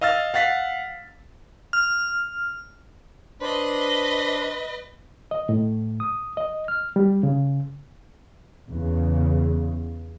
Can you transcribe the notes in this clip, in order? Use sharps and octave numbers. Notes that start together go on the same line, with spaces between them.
D#5 F5 E6 F6 A6
F5 F#5 A6 B6 C7
F6
D4 B4 C5 D#5
D#5
A2
D#6
D#5
F6
G3
C#3
E2 C#3